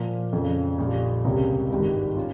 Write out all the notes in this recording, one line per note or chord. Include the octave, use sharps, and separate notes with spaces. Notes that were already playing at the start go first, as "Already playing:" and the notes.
Already playing: A#2 F3 A#3
F2 C#3 F3
A#1 A#2 G3
C#2 C3 G3 A#3 C#4
G#1 G2 D#3 G3
C#4 F4